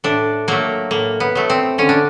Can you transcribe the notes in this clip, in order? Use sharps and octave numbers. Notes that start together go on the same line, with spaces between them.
A2 D4
F#3 A3 A#3
A2 A#3
B3
F#3 A3
C4
D3 C#4
D4